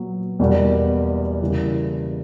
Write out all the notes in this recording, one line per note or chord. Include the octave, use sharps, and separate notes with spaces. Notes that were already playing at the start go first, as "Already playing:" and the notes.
Already playing: A#2 F#3 B3
E2 B2 G3 A#3
C#3 E3 G3 A#3